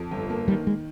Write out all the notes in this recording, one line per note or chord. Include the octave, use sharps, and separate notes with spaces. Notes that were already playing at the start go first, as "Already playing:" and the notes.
Already playing: F2
G1
A#3
D#3 G3
G#3